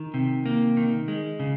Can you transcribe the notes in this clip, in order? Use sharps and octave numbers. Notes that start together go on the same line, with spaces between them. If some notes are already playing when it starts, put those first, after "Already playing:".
Already playing: D#3
C3
A#3
D#3
G#3
C#3